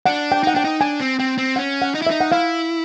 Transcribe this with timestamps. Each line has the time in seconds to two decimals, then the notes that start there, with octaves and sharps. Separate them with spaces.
0.06 D4 F#5
0.32 G5
0.43 D#4 F#5
0.55 D4 G5
0.64 D#4
0.81 D4 G#5
1.00 C4
1.19 C4 G5
1.38 C4
1.56 C#4 F#5
1.82 F#5
1.94 D#4
2.02 E4
2.07 E5
2.11 D#4
2.21 F#5
2.32 E4 F5